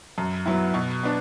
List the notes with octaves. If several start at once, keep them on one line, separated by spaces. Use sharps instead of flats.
F#2
F#3 B3 E4
B2
B3 D4